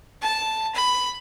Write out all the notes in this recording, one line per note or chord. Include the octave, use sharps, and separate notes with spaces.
A5
B5